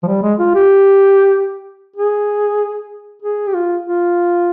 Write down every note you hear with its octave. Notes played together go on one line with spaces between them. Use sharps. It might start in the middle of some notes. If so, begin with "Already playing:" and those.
F3
G3
G#3
F4
G4
G#4
G#4
G4
F4
F4